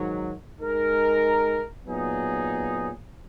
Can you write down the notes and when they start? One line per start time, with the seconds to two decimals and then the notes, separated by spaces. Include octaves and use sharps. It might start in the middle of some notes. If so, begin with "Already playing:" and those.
Already playing: G#2 D#3 F#3
0.60 G#3 D#4 A#4
1.87 A#2 F#3 B3 D#4 G#4